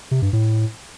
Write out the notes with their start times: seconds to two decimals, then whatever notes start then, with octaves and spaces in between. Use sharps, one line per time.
0.11 C3
0.22 G2
0.33 A2